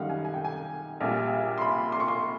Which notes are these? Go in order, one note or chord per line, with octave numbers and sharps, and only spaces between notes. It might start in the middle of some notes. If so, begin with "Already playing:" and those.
Already playing: F#2 D#3 G3 F5 F#5
G#5
G#5
G5
G#5
A#1 A#2 G3
C6
B5
C6
C#6
C6